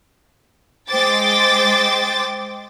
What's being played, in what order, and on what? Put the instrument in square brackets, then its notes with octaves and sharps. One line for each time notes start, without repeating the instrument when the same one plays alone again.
[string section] G#3 C5 G5 D6 A6